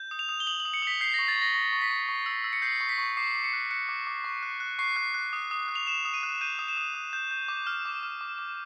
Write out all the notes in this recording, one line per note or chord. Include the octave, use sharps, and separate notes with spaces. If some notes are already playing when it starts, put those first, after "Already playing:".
Already playing: G6
D#6
F7
D#6
G7
D#6 F#7
F#7
D#6
C#7
D#6 B6
G6 C7
A#6
C#6
A6
C#6
A#6
C#6 A#6
C#6
B6
C#6
C#6
E6
E6
C#7
G6 C7
C#6
B6
C#6
D6 C7
D6
C#7
F#6
F#6 C#7
D6
D6
C#6
F#6
F#6
C#6 C7
F#6
F#6
D#6
D#6
F#6
F7
D#6 E7
D#6
D#7
F#6
G6 D#7
D#6
E7
D#6
D#6
G6
G6
D6
F6
D6
F6
D6
D6